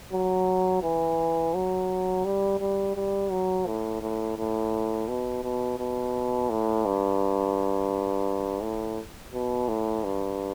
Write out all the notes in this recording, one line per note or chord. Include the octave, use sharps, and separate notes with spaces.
F#3
E3
F#3
G3
G3
G3
F#3
A2
A2
A2
B2
B2
B2
A2
G2
A2
B2
A2
G2